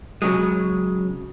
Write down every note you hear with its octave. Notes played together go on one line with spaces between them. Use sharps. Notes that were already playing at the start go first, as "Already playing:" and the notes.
C#3 F#3 G#3